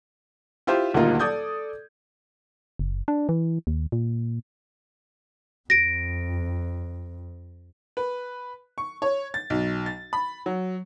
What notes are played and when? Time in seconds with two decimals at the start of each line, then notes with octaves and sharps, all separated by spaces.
0.67 E4 F4 G4 C5
0.94 D#1 D2 A#2 A#3 D#4 F4
1.19 A4 D5 D#6 G6 G#6
2.79 F#1
3.08 D4
3.29 E3
3.67 D#2
3.92 A#2
5.70 F2 A#6 D7
7.97 B4
8.78 C#6
9.02 C#5
9.34 A6
9.50 B1
9.86 A6
10.13 B5
10.46 F#3